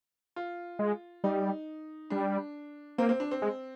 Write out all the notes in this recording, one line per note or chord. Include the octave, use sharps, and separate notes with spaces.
F4
G#3
G3 D#4
G3 D4
A#3 C4
C4
D4
C4
G#3